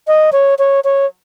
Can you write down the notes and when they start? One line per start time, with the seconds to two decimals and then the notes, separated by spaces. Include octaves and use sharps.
0.07 D#5
0.32 C#5
0.59 C#5
0.84 C#5